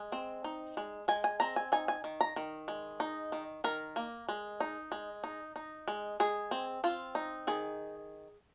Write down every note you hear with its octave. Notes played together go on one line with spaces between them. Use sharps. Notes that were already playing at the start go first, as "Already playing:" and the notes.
Already playing: G#3
C4
D#4
G#3
G#3 G#5
G#5
C4 A#5
G#5
D#4 G#5
G#5
D#3
A#5
D#3
G#3
D#4
D#3
D#3 A#4
A#3
G#3
D#4
G#3
D#4
D#4
G#3
G#3 G#4
C4
C4 F4
D#4
D#3 G#4